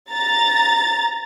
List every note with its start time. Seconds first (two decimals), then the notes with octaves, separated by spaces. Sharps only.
0.11 A#5 A6